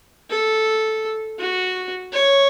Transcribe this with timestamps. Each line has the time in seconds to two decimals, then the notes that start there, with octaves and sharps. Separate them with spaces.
0.30 A4
1.39 F#4
2.13 C#5